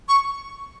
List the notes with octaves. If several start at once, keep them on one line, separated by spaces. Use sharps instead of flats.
C#6